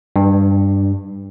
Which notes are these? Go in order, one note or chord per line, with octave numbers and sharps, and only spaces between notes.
G2